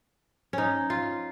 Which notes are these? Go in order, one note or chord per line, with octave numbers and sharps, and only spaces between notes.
C#4 D#4
F4